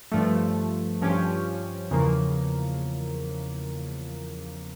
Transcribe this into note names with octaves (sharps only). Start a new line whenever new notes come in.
G2 F3 A3
G2 F3 C#4 G4
E2 C#3 F3 A#3